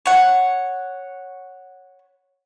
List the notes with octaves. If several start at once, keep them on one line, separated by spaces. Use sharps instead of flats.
C#5 F#5